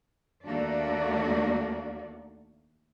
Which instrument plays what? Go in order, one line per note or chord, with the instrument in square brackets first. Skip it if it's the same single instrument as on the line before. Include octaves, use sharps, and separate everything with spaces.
[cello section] D#2 A3 A#3 D4 F#4 D5